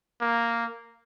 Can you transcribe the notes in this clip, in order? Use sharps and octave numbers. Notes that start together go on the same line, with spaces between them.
A#3